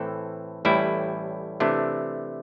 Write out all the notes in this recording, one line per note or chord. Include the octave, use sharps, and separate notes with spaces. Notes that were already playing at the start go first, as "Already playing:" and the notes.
Already playing: A2 E3 C4 A4
A1 A2 G3 E4
C3 E3 A3 D4